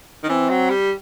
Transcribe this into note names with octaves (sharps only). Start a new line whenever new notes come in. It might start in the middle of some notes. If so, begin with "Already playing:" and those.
D#3
E3 C4
F#3
G3